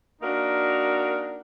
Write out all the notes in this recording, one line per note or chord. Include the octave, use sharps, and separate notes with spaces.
A#3 D4 D#4 F#4 A#4